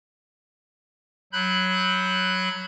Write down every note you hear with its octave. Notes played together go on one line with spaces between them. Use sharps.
F#3 B5 F#6 G6